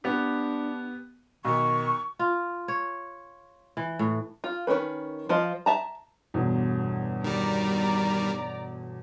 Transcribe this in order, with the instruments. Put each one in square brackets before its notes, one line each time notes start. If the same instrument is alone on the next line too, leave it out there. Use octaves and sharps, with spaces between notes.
[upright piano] B3 G4 [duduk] D4
[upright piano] B1 [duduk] D#3 [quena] C#6
[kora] F4
C#5
E3
A2
[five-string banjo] F4
D#3 G#3 C#4 B4
F3 F4 C5 D#5
E5 A5 A#5
[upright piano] G1 E2 B2
[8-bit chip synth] D#3 G3 [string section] D5 A#5